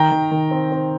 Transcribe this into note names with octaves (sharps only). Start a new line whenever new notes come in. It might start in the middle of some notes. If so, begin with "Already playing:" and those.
Already playing: D#3 G5 A#5
D#3
D#3
C4
C4